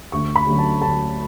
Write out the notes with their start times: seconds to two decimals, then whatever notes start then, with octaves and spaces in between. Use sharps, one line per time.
0.12 D2 C#6
0.36 B5
0.47 D3 F#3 A3 C#4
0.59 A5
0.81 D2 A5